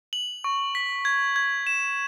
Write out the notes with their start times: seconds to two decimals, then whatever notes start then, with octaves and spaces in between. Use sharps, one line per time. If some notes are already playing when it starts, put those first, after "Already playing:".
0.13 F#7
0.44 C#6
0.75 B6
1.05 G#6
1.36 G#6
1.67 E7